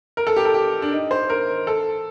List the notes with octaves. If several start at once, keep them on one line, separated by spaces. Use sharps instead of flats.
A#4
A4
G4
A4
G4
D4
D#4
C5
A#4
A4